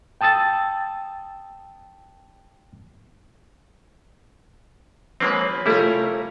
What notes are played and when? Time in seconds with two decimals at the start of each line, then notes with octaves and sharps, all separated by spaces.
0.21 G5 A5 D#6 E6 A6
5.20 F3 G#3 A#3 C4 C#4 B4
5.66 C3 G3 A3 C#4 E4 F4 A#4